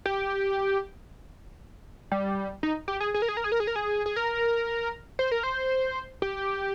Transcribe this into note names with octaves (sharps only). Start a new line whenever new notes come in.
G4
G3
D#4
G4
G#4
G#4
A#4
G#4
A#4
G#4
A#4
G#4
A#4
G#4
G#4
A#4
C5
A#4
C5
G4